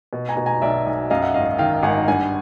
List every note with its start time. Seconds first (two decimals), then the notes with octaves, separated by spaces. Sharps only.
0.13 B2
0.29 G#5 A#5
0.37 B2
0.46 G#5 A#5
0.62 B1 D5 E5
0.87 B1
1.10 F#2 D#5 F5
1.22 E5 F#5
1.34 G#1 D#5 F5
1.58 D#3 F5 G5
1.83 G#1 F#5 G#5
2.08 G2 F#5 G#5